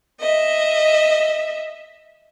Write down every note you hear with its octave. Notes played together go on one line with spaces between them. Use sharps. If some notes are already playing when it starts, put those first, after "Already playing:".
D#5 E5